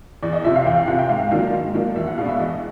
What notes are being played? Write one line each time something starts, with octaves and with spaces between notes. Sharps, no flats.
E2 D5
D#5
C3 F3 E5
F5
E2 G5
F5
C3 F3 F#5
G5
G#2 F5
D#3 F#3 A#3 D4
G#2
D#3 F#3 A#3 D4
E2 E5
F#5
B2 G#3 B3 D4 F5
E5
E2 D#5